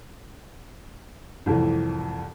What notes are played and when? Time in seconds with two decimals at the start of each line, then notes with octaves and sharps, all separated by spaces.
1.46 C2 F2 A2 E3